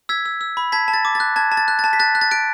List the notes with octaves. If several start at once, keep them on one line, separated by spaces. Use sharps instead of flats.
E6 G#6 B6
E6
E6
B5
A5 G#6 B6
A5
A6
D6
A6
F#6
A5 G#6
A5
A6
F#6
A6
A5
B6
F#6 A6
F#6
A6
F#6 D7